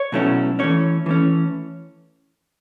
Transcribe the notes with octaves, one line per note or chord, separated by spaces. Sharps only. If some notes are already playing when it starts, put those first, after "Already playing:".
Already playing: C#5
B2 F#3 A3 C#4 E4
E3 A3 C#4 C#5
E3 A3 C#4